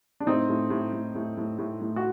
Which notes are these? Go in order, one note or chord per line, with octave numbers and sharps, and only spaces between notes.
D4
A2 C4 D#4
A2
A2
A2
A2
A2
A2
A2
F#4